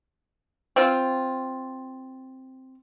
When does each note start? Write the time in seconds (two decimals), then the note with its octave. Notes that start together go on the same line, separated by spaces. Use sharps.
0.76 C4 F4